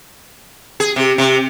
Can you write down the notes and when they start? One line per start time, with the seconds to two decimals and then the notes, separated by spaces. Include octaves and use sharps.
0.80 G#4
0.96 C3
1.18 C3